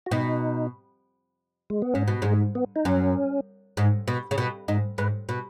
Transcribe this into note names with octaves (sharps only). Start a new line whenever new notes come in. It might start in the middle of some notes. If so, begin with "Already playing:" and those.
F#4
B2 D#4
G#3
B3
G#2 C#4
B2
G#2 G#3
B3
D#4
F#2 C#4
G#2
B2
C#3
B2
G#2 D#4
G#2 B4
B2